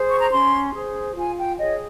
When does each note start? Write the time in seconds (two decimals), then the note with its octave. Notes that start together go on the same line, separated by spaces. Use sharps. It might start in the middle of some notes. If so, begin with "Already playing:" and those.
Already playing: G#4 C5
0.09 C#6
0.21 A#5
0.31 C#4 C6
0.73 G#4 C5
1.16 F4 G#5
1.38 G5
1.59 G#4 C#5 D#5